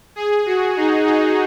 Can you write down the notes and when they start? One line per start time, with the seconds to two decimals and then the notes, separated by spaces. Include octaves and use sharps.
0.16 G#4
0.46 F#4
0.77 D#4
1.06 D#4